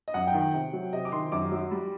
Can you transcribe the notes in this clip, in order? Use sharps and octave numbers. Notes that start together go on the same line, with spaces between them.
D#5
F#2 F#5
G5
D#3
G5
C3
F#3
C3 D#5
D6
D#3 C6
F#2 D6
F#3
G3